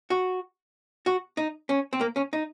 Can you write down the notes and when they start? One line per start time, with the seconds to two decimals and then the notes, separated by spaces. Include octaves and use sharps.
0.10 F#4
1.06 F#4
1.37 D#4
1.69 C#4
1.93 C4
2.01 A#3
2.16 C#4
2.33 D#4